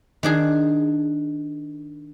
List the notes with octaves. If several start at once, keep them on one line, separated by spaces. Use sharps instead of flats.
D#3 D4 G#4